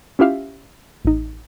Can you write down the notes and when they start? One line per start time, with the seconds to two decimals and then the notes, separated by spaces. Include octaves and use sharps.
0.19 C#4 E4 F4 G4 E5 F5
1.05 A1 D#4